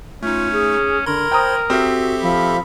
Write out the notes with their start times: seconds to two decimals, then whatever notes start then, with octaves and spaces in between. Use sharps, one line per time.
0.23 A3 C#4 D#4 F4
0.53 G#4
1.06 D3 A#4 B5 C6 G#6
1.31 C5 G5 A#5 D#6
1.70 C4 F#4 G4 A4 E5
2.22 F3 B5